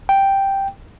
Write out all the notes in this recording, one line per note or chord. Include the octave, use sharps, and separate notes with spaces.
G5